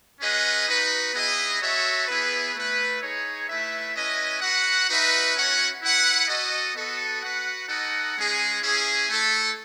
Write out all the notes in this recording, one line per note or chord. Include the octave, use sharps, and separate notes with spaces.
C#4 G#4 B4 D#5 F#5
D#4 F#4 B4
B3 E4 G#4 D#5
F#4 A4 C#5 E5
B3 E4 G#4 B4
A3 E4 B4
D#4 G#4 C#5
A3 E4 B4 E5
C#4 E4 B4 D#5
F#4 B4 F#5
D#4 F#4 B4 E5
C#4 F#4 C#5 F#5
E4 B4 F#5
F#4 A4 D#5
B3 F#4 A4 D#5
F#4 B4 F#5
D#4 A4 D#5 F#5
G#3 C#4 G#4
C#4 E4 G#4
A3 E4 A4